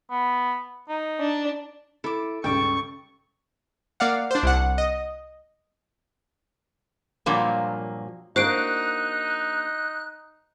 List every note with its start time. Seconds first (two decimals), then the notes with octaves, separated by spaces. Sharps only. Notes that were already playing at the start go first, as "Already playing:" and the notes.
0.10 B3
0.88 D#4
1.19 D4
2.04 E4 A4 D6
2.44 C#2 G2 C#3 A4 G5 C#6 D6
4.00 A#3 D5 F5 F#5
4.31 D4 C5
4.43 C2 F#5
4.78 D#5
7.26 G2 A#2 F3 F#3 A#3
8.36 A#3 D4 D#4 F#4 C5 F#6 C7 D7